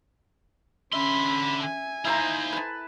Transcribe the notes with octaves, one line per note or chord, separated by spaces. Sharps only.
D3 C#4 E5 B5 C6
G#5
D#4 E4 C5 F5 A#5
B4 A5